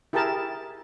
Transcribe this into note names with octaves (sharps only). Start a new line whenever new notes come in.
E4 G4 G#4 A#4 A5